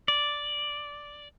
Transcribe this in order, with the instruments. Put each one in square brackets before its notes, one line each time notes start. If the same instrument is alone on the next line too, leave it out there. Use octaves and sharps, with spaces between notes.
[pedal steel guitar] D5